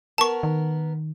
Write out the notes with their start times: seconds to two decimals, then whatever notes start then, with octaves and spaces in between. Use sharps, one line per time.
0.18 B3 A#4 A5 C#6
0.43 D#3